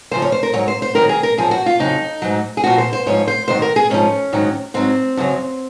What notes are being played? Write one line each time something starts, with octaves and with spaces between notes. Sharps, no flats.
F#2 C#3 F3 C5
C#5
C5
A#4
G#2 F#3 C#5
C5
C5
G#2 D#3 F#3 A#4
G#4
A#4
F#2 F3 G#4
F#4
F4
F2 C#3 F#3 D#4
G#2 F#3
G#4
A#2 F3 F#4
C5
C5
G#2 F3 C#5
C5
G#2 D#3 F#3 C5
A#4
G#4
G#2 F3 C#4
G#2 D#3 F#3
G#2 F#3 C4
F#2 C#3 F#3